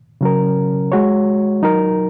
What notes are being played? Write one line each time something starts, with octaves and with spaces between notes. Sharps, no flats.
C#3 F#3 C#4 A#4
G#3 F#4 C#5
F#3 D#4 A#4